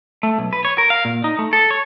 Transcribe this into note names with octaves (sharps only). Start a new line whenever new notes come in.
A3
B1
B4
C#5
A#4
F5
A#2
D#4
A3
A4
C#5